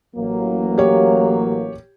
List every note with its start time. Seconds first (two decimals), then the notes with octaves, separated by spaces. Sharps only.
0.16 A1 F#3 A#3
0.78 G4 C#5